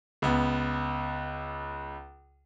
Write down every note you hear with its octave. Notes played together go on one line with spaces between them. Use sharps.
C#2 B3